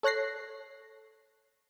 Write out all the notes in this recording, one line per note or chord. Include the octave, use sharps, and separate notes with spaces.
A4 C#5 F#6 A#6 C7